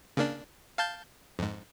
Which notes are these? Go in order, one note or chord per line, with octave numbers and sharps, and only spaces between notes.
C#3 A#3 D4
F5 A5 G6
F2 G#2